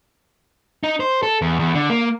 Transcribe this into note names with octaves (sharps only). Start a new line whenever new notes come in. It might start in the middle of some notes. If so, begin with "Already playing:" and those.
D#4
C5
A4
E2
E2
D3
A#3